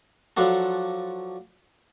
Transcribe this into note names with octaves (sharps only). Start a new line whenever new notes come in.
F3 F#3 D4 F#4 A4